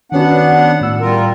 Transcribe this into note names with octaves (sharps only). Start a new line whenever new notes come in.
D#3 B3 C#4 D4 F#4 F#5
A2 E6
G3 F4 A#4